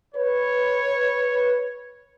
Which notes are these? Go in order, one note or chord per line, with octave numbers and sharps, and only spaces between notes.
B4 C#5